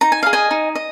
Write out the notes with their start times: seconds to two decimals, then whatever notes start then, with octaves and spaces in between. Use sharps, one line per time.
0.01 D#4 A#5
0.12 G#5
0.23 G#4 D#5 F5
0.33 D#5 G#5
0.51 D#4
0.75 D#5